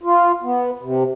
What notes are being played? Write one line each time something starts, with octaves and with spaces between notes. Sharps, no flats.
F4
B3
C3